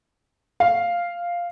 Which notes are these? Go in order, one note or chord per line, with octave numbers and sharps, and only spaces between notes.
F5